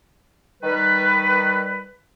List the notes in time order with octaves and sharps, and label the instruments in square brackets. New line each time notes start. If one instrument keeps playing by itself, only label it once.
[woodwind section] D#3 G3 B4